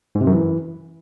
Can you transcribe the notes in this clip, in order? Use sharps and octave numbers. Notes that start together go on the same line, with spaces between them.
G#2
C3
F#2
E3